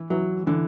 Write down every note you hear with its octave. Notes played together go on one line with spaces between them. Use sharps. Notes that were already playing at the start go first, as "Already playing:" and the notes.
Already playing: E3
E3 F#3
D3 E3